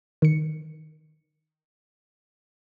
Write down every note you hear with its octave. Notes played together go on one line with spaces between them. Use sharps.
D#3 C#7